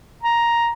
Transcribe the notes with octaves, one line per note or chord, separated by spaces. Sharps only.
A#5